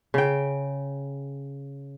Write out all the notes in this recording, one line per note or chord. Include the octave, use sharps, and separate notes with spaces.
C#3 G5